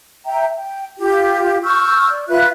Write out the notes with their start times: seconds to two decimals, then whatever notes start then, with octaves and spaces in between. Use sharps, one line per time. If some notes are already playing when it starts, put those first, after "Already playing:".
0.25 E5 G5 A#5
0.57 G5
0.98 F4 G4
1.63 C#6 E6 F6 G6
2.09 D5
2.29 F4 B4 E5 F#6